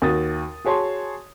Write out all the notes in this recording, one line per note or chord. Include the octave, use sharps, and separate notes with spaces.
D#2 F#4 D#6 A6
F#4 G#4 C#5 A5 C6